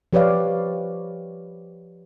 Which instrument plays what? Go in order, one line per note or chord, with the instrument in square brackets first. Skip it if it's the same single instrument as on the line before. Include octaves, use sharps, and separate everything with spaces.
[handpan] F3 G4 B4 C#5 D5 F5